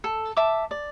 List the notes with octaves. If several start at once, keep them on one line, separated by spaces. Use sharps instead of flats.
A4
E5 A5 D6
D5